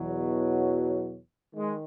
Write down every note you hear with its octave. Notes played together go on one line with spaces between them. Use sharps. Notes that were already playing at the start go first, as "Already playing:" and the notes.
Already playing: E2 B2 F#3
D#3 G#3